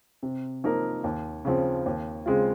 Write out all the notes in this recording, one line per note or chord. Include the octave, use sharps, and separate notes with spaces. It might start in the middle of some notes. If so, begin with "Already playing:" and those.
C3
F3 A#3 D#4 A#4
D#2
C#3 F3 C4
D#2
C#3 G#3 C4 F4